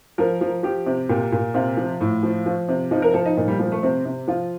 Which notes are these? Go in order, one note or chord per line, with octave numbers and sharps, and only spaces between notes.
F3 A#4
F3
F3 G4
C3
A#2 G4
A#2
C3 F4
F3
A2
F3
F3
C3
F3 D#4
A#4
F3 A4
D#4
A#2 D#4
G3
F3 G3
A3
C3 C4
C3
F3 F4